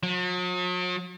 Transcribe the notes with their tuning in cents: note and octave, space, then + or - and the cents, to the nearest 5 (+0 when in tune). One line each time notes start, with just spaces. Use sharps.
F#3 -45